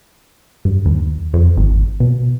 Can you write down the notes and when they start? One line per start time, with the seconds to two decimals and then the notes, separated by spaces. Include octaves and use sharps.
0.65 G2
0.85 D#2
1.34 F2
1.57 G#1
2.00 B2